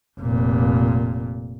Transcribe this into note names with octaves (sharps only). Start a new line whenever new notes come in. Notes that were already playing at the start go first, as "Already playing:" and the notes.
F1 A#2